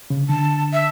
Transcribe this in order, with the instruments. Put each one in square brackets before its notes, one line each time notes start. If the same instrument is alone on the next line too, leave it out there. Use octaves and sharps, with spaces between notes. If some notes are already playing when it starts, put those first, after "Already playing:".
[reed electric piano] C#3
[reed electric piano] D3 [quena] A5
[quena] E5